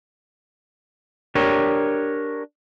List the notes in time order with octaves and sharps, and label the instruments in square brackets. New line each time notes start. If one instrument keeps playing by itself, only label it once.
[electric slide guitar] D4 G4 A#4 C#5